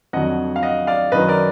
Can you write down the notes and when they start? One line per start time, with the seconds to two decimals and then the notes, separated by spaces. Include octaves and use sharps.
0.13 F2 D3 F#3 D#5 F#5
0.56 F5
0.63 D#5 F#5
0.87 D5 F5
1.12 F#2 D#3 F#3 B4 D#5
1.28 A#4 D5